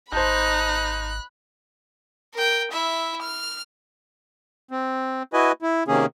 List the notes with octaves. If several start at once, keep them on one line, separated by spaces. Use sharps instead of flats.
G#1 D#4 C5 A5 B5 F#6 G6
A#4 G5
E4 E5
F6
C4
E4 F#4 B4 D#5 G#5
E4
C3 D#3 A#3 C#4 G#4